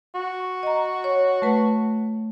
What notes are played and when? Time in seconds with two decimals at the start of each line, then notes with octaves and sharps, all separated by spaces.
0.15 F#4
0.63 D#5 A#5
1.04 C#5
1.42 A3 B4